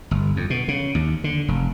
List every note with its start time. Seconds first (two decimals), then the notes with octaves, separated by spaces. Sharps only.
0.11 G1
0.36 F2
0.50 B2
0.68 C#3
0.95 D#2
1.24 D3
1.48 F1